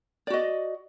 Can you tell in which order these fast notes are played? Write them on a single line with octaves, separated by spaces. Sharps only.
D5 F#4 D#5